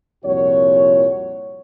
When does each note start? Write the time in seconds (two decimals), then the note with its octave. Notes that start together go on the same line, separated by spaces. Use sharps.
0.24 C2 F2 A#2 F#4 C#5